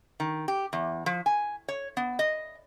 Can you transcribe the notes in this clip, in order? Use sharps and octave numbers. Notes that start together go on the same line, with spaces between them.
D#3
G4
E2
F3
G#5
C#5
B3
D#5